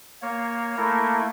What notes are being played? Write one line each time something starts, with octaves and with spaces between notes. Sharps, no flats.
A#3 C#5
A3 A#3 E4 A4 A#4